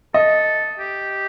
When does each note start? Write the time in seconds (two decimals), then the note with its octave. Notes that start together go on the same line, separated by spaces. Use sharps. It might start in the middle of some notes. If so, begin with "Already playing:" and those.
0.14 A4 D#5
0.79 G4